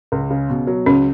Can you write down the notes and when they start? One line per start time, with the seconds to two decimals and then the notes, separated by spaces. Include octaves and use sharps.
0.12 C#2
0.30 C#3
0.50 B2
0.67 F#3
0.86 C#2 C#4